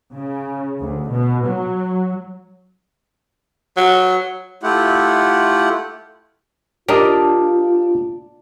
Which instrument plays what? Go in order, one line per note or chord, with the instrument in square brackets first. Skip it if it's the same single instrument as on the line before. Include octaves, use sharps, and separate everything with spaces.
[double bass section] C#3
D2
B2
F#3
[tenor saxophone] F#3
[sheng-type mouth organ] A3 E4 F4 G4 F#5
[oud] D4 [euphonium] F4 [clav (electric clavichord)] G4 A#4 D#5